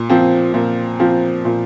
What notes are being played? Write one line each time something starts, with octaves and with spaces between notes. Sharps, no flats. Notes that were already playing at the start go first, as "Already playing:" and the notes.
Already playing: A#2
F3 C4
A#2
F3 C4
A#2